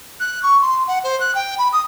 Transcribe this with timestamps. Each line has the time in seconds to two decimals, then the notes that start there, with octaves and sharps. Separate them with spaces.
0.20 F#6
0.43 C#6
0.62 C6
0.88 F#5
1.04 C5
1.20 F#6
1.35 G5
1.58 B5
1.73 D#6